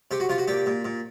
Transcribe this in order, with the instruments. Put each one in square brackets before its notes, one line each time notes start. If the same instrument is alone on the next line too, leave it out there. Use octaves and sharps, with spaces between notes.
[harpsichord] C3 G4
F#4
C3 F4
F#4
A#2 G4
A#2
A#2